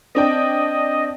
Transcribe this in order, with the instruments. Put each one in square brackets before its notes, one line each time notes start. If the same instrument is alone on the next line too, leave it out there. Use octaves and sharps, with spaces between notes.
[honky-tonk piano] C4 D4 G5 [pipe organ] D#5